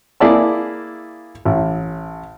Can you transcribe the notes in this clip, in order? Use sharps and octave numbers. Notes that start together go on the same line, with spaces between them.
A#3 E4 G#4 D5 E5 A5
A1